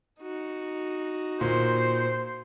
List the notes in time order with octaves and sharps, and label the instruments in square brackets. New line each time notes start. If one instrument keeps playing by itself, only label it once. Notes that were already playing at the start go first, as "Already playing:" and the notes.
[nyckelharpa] D#4 F#4
[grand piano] A#2 [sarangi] C5